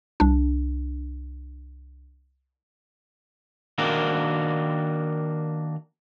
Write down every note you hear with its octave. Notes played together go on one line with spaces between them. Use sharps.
C2 D4
D#3 A#3 D4 F#4 A#4